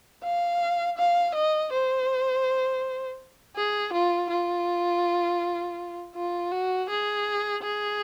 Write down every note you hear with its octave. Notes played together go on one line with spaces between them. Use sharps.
F5
F5
D#5
C5
G#4
F4
F4
F4
F#4
G#4
G#4